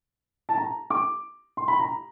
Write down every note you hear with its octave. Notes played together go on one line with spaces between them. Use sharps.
A5
A#5
D6
C6
B5
A#5